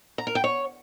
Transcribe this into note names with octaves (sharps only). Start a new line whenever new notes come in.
A#5
A#4
G5
C#5